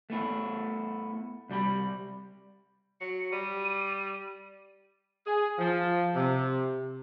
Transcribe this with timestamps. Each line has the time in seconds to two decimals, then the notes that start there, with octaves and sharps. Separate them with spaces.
0.10 A3 B3 E4
1.49 C2 G3 G4 B5
3.01 F#3 C#7
3.32 G3 D#7
5.26 G#4
5.58 F3
6.15 C3